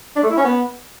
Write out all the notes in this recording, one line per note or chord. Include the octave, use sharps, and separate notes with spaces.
D4
A3
E4
C#4
B3